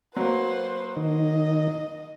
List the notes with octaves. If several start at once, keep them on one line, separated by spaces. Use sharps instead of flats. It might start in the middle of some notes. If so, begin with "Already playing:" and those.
F#3 A#3 B4 C5
D#3 D#5